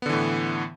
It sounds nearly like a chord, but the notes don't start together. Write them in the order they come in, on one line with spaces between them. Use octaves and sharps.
B3 D3 E3 A2